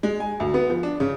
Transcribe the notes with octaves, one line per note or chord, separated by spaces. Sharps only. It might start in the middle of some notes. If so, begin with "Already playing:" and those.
G#3
G#5
D2
B3
F3
D4
C#3